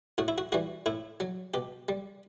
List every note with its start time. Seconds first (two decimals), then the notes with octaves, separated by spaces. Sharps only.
0.18 A2 F#4
0.28 E4
0.38 F#4
0.52 E3 G3 F#4
0.86 A2 E4
1.20 F#3
1.54 B2 G4
1.89 G3